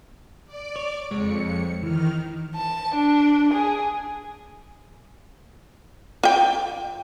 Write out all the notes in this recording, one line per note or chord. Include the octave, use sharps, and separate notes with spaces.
D5 D6
C#5
F2 G#3 C#5 C#7
D#3 E3 F6
A5
D4
G#4
F4 G5